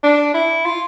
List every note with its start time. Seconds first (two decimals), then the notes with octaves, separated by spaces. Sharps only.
0.03 D4
0.34 E4
0.65 F4